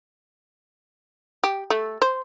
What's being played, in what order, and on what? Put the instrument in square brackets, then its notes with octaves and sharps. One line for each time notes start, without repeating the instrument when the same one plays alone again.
[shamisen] G4
A3
C5